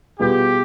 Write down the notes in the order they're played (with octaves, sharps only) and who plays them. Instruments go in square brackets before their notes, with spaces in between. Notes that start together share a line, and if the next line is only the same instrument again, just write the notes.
[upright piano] B2 G3 B3 F4 G#4 [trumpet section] G4